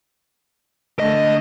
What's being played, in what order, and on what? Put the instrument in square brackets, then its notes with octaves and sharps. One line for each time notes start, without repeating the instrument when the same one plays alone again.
[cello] D3 A3 [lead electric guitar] D#5